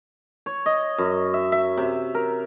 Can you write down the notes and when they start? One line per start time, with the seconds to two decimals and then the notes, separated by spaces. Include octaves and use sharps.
0.46 C#5
0.66 D#5
0.98 F#2
1.34 E5
1.52 E5
1.77 C3
2.14 A#4